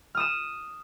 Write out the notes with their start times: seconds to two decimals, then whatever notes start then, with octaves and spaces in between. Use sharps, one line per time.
0.15 F6
0.17 D#6
0.20 E7